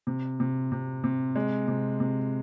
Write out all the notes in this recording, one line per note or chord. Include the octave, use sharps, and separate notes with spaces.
C3
C3
C3
C3
G#3
C3
C3